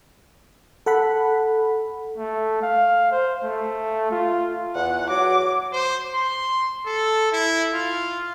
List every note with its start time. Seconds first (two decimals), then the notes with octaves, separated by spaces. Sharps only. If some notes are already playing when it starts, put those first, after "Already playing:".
0.86 A4 F#5 B5
2.18 A3
2.62 F5
3.12 C5
3.44 A3
4.11 F4
4.75 E2 F#5
5.10 F#3 D6
5.72 C5
6.13 C6
6.86 A4
7.32 E4
7.74 F4